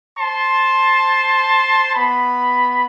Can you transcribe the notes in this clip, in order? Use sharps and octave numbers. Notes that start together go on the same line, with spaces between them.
C5 A5 C6
B3 B5